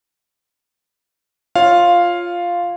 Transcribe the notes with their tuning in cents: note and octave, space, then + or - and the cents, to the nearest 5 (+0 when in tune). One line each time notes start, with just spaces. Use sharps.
F4 +0 C#5 -10 F5 +0